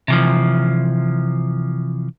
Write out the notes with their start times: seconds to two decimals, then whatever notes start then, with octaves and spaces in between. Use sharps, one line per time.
0.08 C3 E3 F3